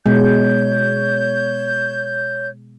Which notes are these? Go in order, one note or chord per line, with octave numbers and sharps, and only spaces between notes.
B2 G#3 C#5 G6